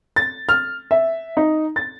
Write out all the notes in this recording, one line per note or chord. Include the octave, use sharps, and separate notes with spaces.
A6
F6
E5
D#4
A6